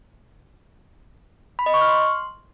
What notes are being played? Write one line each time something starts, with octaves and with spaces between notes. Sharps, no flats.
B5
D#5
C#6
F6
C6